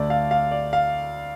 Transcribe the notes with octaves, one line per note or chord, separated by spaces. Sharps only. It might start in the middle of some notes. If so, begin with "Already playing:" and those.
Already playing: D2 D3 A3 D5
F5
F5
D5
F5